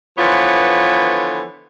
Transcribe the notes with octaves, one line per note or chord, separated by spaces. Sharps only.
D3 E3 F3 B3 F4 C#5